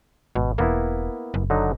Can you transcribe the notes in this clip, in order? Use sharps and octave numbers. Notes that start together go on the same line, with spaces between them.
G#1 B2
E1 A#3 B3 E4
F#1
D3 F#3 D#4